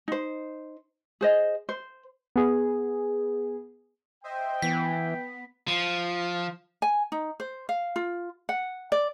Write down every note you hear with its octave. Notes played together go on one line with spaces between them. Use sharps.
D#4 C5
G#4 C5 D#5
C5
B3 G#4
C5 D#5 E5 G5
E3 B3 B6
F3
G#5
D#4
C5
F5
F4
F#5
D5